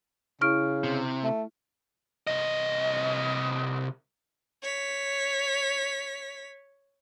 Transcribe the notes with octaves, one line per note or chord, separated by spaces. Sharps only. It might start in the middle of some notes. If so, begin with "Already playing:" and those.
C#3 E4 C#6 F6 D7
C3
A3
C2 D#5
C#5 B6